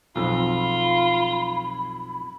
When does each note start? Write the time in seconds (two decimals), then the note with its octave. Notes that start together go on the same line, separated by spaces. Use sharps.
0.16 B1 F2 F4 B5